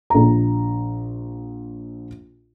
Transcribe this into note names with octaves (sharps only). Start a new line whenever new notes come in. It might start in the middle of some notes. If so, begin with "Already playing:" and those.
A#1 A#5